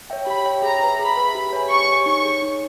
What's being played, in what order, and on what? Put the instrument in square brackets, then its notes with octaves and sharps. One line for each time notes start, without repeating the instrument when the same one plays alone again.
[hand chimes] C#5 E5 G5
[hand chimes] G4 [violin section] B5
[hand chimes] C#5 E5 G5
[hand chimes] G#4 [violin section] A#5
[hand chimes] B4 E5
[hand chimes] G#4 [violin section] B5
[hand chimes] B4 E5
G4
C#5 G#5
[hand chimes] G4 [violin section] C#6
[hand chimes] C#5 G#5
[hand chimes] D#4 [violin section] C#6
[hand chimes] G#4 C#5
D#4